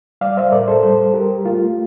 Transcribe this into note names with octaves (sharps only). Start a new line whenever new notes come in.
G3 D5 F5
C5 E5
A2 A#4 D5
A4 C5
G3 A4 C5
G3 G4 A#4
A3 F4